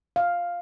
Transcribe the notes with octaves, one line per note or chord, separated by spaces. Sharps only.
F5